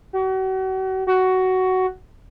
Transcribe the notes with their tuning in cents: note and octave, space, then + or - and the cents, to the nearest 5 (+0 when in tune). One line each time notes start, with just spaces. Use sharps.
F#4 +40
F#4 +10